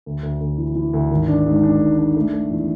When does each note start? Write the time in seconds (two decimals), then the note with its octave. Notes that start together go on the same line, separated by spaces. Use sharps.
0.06 D2
0.23 D2
0.40 D2
0.58 E3
0.75 E3
0.93 D2
1.11 G#1
1.28 D4
1.46 G#2
1.63 D4
1.80 G#2
1.98 D4
2.16 A3
2.33 A3
2.51 E2